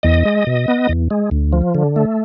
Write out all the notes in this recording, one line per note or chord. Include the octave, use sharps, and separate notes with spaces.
E2 D#5
G#3
B2
B3
E2
G#3
D2
F3
D3
A3